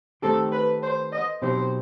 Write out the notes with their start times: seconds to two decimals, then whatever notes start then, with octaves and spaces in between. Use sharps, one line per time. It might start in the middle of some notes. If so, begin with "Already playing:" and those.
0.22 D#3 A3 C4 D#4 G4 A4
0.52 B4
0.83 C5
1.12 D#5
1.42 B2 F#3 C4 D#4 G4 C5